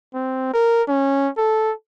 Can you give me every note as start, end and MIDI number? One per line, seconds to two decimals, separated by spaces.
0.14 0.50 60
0.54 0.83 70
0.89 1.29 61
1.38 1.73 69